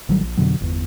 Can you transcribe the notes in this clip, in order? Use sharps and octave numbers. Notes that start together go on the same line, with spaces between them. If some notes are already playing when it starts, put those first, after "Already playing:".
A1 D#3 F#3 G3
A#1
F2 B2 D3 F#3
G1 E2